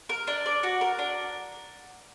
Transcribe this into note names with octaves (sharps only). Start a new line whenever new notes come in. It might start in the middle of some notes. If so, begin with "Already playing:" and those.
A#4
D4
D5
F#4
A#4
D4